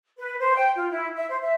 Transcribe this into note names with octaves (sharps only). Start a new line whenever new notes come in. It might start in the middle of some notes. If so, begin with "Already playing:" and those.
B4
C5
G5
F4
E4
E5
C5
E5